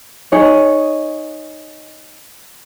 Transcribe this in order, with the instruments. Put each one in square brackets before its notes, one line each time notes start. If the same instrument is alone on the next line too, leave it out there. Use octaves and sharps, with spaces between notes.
[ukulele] D#4 G#4 C#5